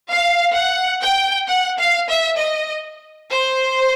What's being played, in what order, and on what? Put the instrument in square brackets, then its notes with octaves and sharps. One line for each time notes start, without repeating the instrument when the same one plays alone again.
[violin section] F5
F#5
G5
F#5
F5
E5
D#5
C5